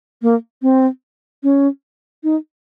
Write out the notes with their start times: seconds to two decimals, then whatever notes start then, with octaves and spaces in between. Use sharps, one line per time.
0.22 A#3
0.62 C4
1.43 C#4
2.23 D#4